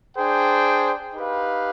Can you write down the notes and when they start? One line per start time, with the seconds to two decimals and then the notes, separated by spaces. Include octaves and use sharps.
0.16 D4 G#4 C5 G5
1.13 D#4 G4 B4 F5